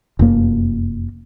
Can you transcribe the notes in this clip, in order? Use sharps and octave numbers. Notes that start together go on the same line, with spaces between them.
F1 F#2 A#3